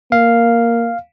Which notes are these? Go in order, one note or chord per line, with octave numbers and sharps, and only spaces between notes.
A#3 F5